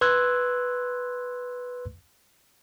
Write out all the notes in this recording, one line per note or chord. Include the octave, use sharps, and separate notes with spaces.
B4 C6 E6 F#6 G#6